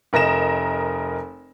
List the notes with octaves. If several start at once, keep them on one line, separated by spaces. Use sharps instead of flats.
F1 A#4 D#5 A#6 E7